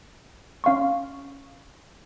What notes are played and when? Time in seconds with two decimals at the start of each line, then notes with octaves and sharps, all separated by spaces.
0.64 C#4 F5 C6 C#6